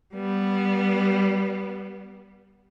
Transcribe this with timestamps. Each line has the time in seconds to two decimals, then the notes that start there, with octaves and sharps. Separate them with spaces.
0.14 G3 B3